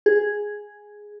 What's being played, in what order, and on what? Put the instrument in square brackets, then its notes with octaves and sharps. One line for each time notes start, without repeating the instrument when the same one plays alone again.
[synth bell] G#4